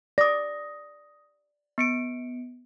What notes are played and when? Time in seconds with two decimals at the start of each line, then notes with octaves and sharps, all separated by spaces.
0.18 D5 D#6 A#6
1.78 B3 C#7 D7